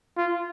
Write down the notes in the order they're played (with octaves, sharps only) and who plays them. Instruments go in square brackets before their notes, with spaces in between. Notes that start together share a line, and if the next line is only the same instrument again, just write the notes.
[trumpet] F4